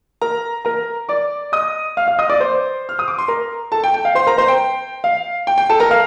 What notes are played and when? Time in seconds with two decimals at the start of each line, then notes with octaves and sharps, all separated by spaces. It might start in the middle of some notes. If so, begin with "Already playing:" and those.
0.21 A#4 A#5
0.65 A#4 A#5
1.09 D5 D6
1.52 D#5 D#6
1.97 F5 F6
2.08 F5 F6
2.18 D#5 D#6
2.30 D5 D6
2.40 C5 C6
2.89 F6
2.99 D#6
3.08 D6
3.18 C6
3.28 A#4 A#5
3.72 A4 A5
3.84 G5
3.94 G5
4.05 F5
4.15 C5 C6
4.27 A#4 A#5
4.38 C5 C6
4.48 G5
5.04 F5
5.47 G5
5.58 G5
5.69 A4 A5
5.80 A#4 A#5
5.91 F5 F6